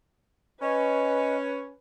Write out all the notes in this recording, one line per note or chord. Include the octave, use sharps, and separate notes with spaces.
C#4 B4 D#5